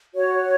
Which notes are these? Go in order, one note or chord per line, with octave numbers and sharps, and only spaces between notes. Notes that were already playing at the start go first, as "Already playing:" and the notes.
F#4 C#5